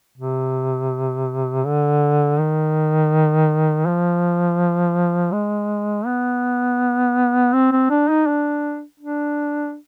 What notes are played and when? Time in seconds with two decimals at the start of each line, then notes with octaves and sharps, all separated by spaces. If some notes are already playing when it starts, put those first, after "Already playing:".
0.18 C3
1.65 D3
2.39 D#3
3.86 F3
5.32 G#3
6.06 B3
7.53 C4
7.72 C4
7.90 D4
8.09 D#4
8.27 D4
9.00 D4